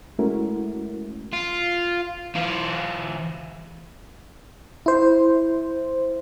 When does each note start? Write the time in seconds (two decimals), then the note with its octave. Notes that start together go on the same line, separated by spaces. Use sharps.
0.19 G#3 A3 C#4 E4 F#4 A#4
1.33 F4
2.35 E3 F4
4.86 E4 C5